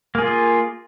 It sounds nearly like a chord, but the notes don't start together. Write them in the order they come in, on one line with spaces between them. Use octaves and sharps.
A#3 G#4 F4